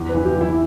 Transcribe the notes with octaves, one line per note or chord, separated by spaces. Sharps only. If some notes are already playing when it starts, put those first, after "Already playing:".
Already playing: E2
B4
E3
G4
E2
E4